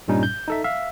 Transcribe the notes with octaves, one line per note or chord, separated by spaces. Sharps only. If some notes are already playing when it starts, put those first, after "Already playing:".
G2 A#2 G3 C#4 D#4
G6
D#4 A4 E5
E5 F5